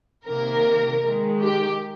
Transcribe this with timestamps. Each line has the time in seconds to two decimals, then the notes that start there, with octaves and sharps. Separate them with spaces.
0.26 C3 D#3 A#3 A#4
1.04 D#3 G#3
1.42 G4